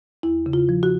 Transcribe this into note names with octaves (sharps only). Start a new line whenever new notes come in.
E2 E4
C#3
F4
F3
F#4